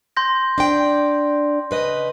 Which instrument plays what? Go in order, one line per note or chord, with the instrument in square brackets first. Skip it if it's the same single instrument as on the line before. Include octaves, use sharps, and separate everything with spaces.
[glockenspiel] C6 G6 A#6
[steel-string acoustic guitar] D4 D5 G5
C#3 B4 D#5